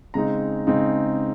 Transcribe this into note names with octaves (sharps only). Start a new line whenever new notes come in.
C#3 G#3 C4 D#4 A#5
C#3 G#3 C4 D#4